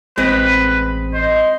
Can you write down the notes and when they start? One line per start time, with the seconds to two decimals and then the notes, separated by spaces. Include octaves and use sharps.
0.18 A1 G#3 C4 B4
1.13 C5 D#5